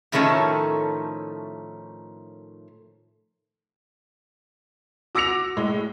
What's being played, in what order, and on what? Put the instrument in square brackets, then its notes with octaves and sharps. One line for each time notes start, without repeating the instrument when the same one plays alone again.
[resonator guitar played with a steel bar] A2 D#3 F3 A3 C#4 A4
[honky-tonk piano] F#4 D6 E6 A#6 C#7 F7
A2 G#3